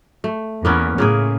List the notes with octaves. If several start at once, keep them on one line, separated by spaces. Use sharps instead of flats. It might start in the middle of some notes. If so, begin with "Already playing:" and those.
A3
E2 A#3 B3 C#4
A2 C#3 A#3 G#4